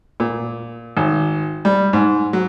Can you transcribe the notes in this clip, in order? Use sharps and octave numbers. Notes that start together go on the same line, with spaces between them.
A#2
G#1
G3
G#2
F#3